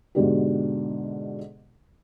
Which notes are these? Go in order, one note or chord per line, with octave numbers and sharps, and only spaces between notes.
G#2 B2 D3 G4